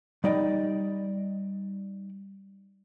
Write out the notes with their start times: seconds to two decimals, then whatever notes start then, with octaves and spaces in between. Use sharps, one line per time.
0.24 G3 D#4 D5 D#5 G5